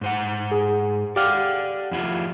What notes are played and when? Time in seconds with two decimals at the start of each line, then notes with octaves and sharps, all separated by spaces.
0.01 G#2 C5 F#5
0.52 G#4
1.16 G4 D5 F5 F#5 F6
1.91 F2 E4 F4